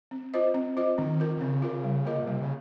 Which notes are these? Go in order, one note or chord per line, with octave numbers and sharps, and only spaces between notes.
C4
F4 C5 D#5
C4
F4 C5 D#5
D#3 C4
F4 A#4
D#3
C#3 C4
F4 A#4
G3
A#3 F4 A#4 D#5
A#2
C3 G3
C#3